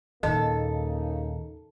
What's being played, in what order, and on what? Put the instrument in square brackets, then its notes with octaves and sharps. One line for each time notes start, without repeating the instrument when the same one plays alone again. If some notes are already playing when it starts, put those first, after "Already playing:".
[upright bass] D#2 A#2 [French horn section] C#3 A#3 D#4 [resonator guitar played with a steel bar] A4 [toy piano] D#5